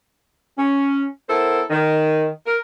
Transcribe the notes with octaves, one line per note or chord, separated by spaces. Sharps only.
C#4
B3 E4 A4 A#4 C5
D#3
A#4